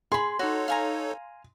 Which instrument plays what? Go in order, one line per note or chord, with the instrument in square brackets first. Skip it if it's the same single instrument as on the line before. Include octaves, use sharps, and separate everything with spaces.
[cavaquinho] G#4 B5 [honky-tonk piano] C6
[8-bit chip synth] D#4 A4 C#5 [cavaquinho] F#4
[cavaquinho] F5 G#5 A#5